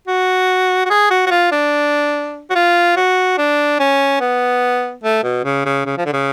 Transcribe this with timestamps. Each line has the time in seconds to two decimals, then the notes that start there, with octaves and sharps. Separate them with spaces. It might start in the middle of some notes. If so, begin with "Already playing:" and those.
0.07 F#4
0.85 F#4
0.90 G#4
1.11 F#4
1.26 F#4
1.31 F4
1.52 D4
2.50 F#4
2.55 F4
2.96 F#4
3.38 D4
3.80 C#4
4.21 B3
5.04 A3
5.23 B2
5.44 C#3
5.65 C#3
5.86 C#3
5.98 F3
6.06 D3
6.13 C#3